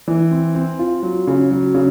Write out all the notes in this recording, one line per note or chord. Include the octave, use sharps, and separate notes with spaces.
E3
C4
C4
F4
F#3
C#3
F#3
C#3